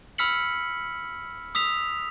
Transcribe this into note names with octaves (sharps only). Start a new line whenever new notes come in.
B5 E6 F6 B6 C#7 F#7
D#6 E6 B6 F7